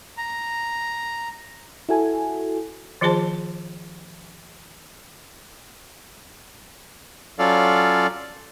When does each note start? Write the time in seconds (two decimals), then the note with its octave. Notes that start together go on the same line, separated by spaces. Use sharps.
0.17 A#5
1.89 E4 F#4 A4 G#5
3.01 D#3 F3 F4 G#4 C5 A5
7.39 F#3 C#4 F4 A4 D5 F5